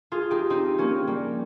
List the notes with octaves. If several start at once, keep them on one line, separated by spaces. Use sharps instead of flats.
F4 G#4
D#4 G4
C4 D#4
A#3 C#4
G3 A#3